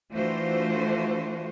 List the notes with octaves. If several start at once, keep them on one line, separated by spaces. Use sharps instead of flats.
E3 A3 D4 F4 F#4 C5